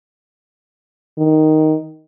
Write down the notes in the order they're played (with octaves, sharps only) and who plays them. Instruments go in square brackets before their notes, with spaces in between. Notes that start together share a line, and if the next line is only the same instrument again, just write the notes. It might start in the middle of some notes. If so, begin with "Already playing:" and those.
[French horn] D#3